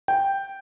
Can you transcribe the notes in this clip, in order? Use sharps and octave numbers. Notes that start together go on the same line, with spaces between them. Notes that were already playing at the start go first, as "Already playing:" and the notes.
G5